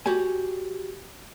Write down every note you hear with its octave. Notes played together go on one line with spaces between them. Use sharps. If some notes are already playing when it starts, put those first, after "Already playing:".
F#4 G4 C#5 G#5